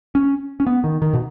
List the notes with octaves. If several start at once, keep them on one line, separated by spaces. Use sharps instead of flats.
C#4
C#4
B3
D#3
D#3
B2